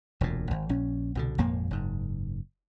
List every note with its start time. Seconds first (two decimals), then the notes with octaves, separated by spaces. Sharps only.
0.21 E1 D2 A#2
0.51 G#1
0.69 A#1 C#4
1.15 C2 B2 D3
1.38 G#1 F2 A#2 A#3
1.71 F#1 G#2